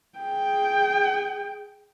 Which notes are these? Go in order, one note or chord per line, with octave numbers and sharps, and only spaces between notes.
G#4 G5